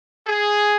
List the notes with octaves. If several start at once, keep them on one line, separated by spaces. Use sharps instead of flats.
G#4